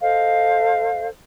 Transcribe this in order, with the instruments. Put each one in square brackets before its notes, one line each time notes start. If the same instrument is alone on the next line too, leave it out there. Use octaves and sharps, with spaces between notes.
[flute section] A4 C5 D#5 F5